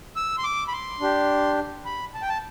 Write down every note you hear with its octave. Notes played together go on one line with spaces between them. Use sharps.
E6
C6
D6
B5
C6
D4 G4
B5
A5
G5
A5